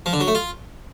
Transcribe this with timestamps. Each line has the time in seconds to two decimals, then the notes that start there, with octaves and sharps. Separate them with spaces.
0.06 F3
0.13 D3
0.20 F#3
0.28 A3
0.35 F4